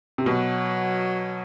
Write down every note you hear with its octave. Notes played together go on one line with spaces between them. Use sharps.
C3
B2 F#3